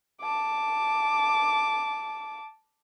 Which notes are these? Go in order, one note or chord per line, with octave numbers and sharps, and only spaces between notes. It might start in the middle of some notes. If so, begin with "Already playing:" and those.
A5 D6